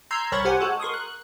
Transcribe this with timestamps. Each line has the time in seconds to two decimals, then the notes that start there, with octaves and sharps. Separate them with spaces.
0.11 A#5 C6 E6 G6 G#6 C7
0.32 C2 A#4 C#5 B5 C#6 A6
0.45 G4 C5 F#5 G#5
0.60 G#3 F#4 A4
0.80 A#4 C6 C#6 D#6
0.94 F#6